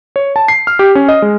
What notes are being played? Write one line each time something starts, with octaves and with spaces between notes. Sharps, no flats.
C#5
A5
C7
F6
G4
C#4
D#5
G#3